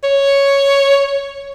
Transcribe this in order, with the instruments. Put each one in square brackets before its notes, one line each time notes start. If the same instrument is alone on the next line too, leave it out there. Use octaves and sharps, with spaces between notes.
[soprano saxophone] C#5